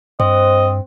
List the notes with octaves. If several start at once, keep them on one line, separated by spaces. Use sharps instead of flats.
G2 C4 C5 D#5